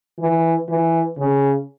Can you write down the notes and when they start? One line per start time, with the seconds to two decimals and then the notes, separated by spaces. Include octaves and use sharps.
0.20 E3
0.69 E3
1.18 C#3